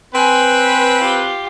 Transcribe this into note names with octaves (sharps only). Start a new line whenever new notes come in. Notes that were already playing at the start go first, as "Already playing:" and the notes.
C4 B4 G#5
F4 G4